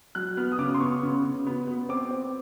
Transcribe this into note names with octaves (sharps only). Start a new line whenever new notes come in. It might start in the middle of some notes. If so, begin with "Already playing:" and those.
F#3 F#6
B3 F6
D#6
C#3 D6
C6
B3 C#6
C#3
C#3
B3
B3
C4 D6
C4